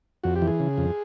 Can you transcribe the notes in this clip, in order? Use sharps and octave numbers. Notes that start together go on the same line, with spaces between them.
F2 F#4
G4
E3
G#4
C#3
F2